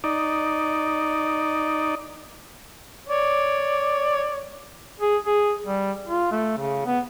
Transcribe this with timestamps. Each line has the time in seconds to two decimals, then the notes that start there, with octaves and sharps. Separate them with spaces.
0.04 D#4 D5
3.08 C#5 D5
5.00 G#4
5.26 G#4
5.66 G3
6.07 F4
6.32 A3
6.58 C#3
6.85 B3